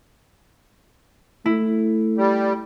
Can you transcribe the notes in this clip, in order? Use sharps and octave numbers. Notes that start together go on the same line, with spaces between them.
A3 E4
G3